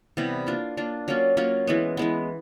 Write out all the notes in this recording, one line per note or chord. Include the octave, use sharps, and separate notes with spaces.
C3 E3 G3 B3
A#3 D4 F4
A#3 D4 F4
F#3 A#3 C#4 F4
F#3 A#3 C#4 F4
E3 G#3 B3
E3 G#3 B3